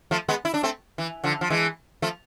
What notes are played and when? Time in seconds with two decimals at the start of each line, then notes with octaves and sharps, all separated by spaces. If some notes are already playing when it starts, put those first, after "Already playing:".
0.11 F3 A3
0.28 G#3 B3
0.45 E4
0.54 D4
0.63 A3 C4
0.98 E3
1.24 D3 F3
1.41 F3
1.50 E3 G#3
2.02 F3 A3